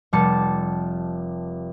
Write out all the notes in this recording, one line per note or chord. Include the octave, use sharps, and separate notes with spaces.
F1 G3 A5 C#7